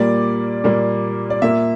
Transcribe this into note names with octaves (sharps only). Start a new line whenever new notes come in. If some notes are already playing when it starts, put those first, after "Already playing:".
Already playing: A#2 G3 A#3 D5
A#2 G3 A#3
D5
A#2 A#3 E5